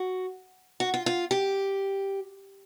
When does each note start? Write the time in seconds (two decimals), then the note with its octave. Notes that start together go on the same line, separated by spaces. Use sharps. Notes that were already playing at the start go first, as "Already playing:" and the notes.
Already playing: F#4
0.80 F#4
0.94 F4
1.06 F4
1.31 G4